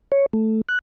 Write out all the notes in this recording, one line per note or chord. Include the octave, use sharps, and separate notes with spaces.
C#5
A3
F#6